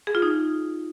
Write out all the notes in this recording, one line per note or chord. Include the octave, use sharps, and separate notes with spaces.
G#4
F4
D#4